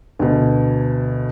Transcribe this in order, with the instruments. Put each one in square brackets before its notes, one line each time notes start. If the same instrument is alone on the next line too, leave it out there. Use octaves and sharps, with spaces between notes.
[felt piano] D2 B2